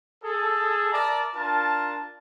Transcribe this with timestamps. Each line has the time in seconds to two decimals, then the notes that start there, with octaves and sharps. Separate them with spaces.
0.23 G#4 A4
0.92 A#4 D5 E5 A5 A#5
1.35 D4 F4 A#4 A5